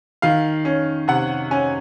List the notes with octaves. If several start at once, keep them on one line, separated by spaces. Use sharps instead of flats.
D#3 F5
C#4
C3 F#5
C#4 G#5